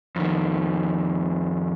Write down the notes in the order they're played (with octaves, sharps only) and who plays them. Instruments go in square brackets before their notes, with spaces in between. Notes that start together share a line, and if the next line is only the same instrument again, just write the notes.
[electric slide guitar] F2 D#3